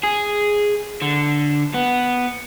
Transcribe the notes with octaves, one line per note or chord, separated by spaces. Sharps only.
G#4
D3
B3